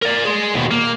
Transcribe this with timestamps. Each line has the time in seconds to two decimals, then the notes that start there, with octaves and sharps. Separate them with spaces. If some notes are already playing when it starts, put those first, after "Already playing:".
0.02 A#4 D5
0.25 G#4 C6
0.54 D#2 B2
0.71 A#3